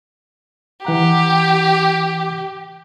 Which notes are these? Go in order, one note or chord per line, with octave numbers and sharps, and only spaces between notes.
E3 G4 F#5 A#5